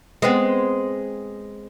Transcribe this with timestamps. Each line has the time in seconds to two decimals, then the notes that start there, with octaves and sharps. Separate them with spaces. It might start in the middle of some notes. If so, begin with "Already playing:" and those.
0.22 G#3 B3 C4